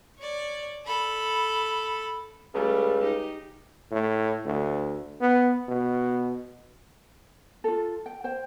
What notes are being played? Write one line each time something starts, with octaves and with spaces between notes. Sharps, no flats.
C#5 D5
A4 B5
C#2 G3 A3
D#4 G4
A2
D2
B3
B2
F4 A4
G5
C5 G5